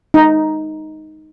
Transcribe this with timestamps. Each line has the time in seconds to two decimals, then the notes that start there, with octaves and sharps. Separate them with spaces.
0.14 D#4